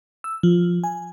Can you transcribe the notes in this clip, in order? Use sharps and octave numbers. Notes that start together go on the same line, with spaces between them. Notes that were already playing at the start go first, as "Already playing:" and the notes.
E6
F3
G#5